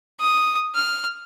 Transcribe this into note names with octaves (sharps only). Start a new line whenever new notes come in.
D#6
F6